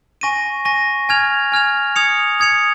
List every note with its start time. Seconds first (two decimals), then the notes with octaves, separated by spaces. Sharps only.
0.21 G#5 C#6 A#6 D#7
0.65 G#5 C#6 A#6 D#7
1.09 G#5 F6 G#6 F7
1.52 G#5 F6 G#6 F7
1.96 D#6 G#6 C#7 F7
2.40 D#6 G#6 C#7 F7